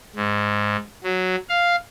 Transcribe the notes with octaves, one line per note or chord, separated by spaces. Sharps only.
G#2
F#3
F5